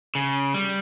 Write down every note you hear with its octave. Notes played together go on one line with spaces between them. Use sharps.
C#3
G3